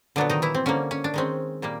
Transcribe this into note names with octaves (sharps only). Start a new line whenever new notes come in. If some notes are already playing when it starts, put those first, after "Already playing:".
A#2 D3 F#3 B3 D4
D#3 D#4
E3 E4
C4
D3 G3 A#3 C#4
C#4
D4
D#3 G#3 C4 C#4
A#2 G3 A#3